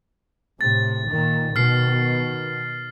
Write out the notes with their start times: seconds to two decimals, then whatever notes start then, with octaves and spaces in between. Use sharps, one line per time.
0.61 A2 C3 A6
1.09 A#2 D#3
1.56 B2 D#3 F6 C7